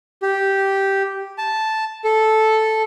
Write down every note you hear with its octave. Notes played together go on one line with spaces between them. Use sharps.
G4
A5
A4